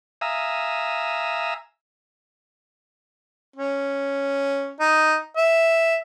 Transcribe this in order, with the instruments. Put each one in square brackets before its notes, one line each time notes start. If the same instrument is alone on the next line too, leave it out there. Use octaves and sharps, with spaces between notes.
[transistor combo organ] E5 F5 G#5 A#5 D#6 E6
[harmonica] C#4
D#4
E5